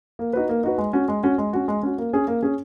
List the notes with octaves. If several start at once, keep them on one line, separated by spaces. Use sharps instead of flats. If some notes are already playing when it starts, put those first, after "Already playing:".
A#3
D#4 F#4 B4
A#3
D#4 F#4 B4
G#3
C#4 F#4
G#3
C#4 F#4
G#3
C#4 F#4
G#3
C#4 F#4
A#3
C#4 G#4
A#3
C#4 G#4